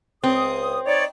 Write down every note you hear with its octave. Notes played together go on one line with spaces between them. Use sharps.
C#2 C4 D#6
D#4 C#5 D5